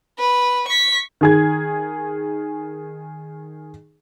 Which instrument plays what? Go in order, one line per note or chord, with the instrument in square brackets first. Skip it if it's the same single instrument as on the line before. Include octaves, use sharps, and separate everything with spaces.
[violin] B4
C#6 B6
[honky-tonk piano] D#3 G#4 G#6